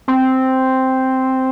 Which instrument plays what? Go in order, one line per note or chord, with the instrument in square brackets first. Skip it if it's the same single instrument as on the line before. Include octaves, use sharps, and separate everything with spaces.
[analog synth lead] C4